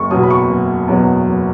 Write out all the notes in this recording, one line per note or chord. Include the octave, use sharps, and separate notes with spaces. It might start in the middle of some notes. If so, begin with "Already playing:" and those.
Already playing: F#1 C#6
E2 B2 F#3 D#6
B5
C#6
F#1
E2 B2 F#3
F#1